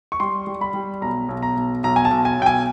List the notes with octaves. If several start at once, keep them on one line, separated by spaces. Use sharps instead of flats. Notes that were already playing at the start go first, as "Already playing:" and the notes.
C#6
G3 C6
G3
B5
G3
B1 A#5
B1
A#5
B1
B1 A#5
G#5
A5
B1
G#5
B1 G5
G#5